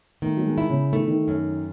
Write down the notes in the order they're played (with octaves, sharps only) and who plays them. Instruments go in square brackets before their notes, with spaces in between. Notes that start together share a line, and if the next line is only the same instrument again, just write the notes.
[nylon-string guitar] D#3 [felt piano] A3
[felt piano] F#3
G#3
[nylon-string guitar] E4
[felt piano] C#3
[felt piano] D#3 [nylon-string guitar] A3
[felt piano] E3
D#3
[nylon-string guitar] F#2